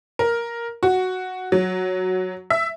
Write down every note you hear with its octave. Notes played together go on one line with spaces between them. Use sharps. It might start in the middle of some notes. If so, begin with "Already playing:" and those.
A#4
F#4
F#3
E5